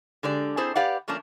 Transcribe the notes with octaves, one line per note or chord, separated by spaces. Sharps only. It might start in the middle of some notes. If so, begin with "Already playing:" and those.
D3 G#3 G4 D5
C4 E4 G#4 A4 C5
G4 B4 D5 F5 F#5
F3 A3 A#3 C#4 D4